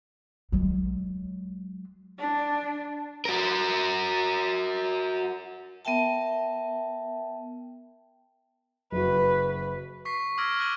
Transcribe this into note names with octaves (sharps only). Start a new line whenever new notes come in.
F#3 G#3
D4
F#4 A#4
B3 A#4 E5 G5 A5
F#1 F#4 B4
C#6 B6 C7
D6 E6 F6 G#6 A#6 D7
D6 F6 F#6 D#7 F#7 G7